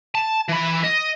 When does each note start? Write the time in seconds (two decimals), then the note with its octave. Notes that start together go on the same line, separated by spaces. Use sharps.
0.15 A5
0.48 E3 B5
0.84 D#5